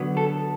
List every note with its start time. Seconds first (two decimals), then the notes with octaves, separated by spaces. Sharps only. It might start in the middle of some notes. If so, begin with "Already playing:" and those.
Already playing: D3 F#3 B3
0.17 A4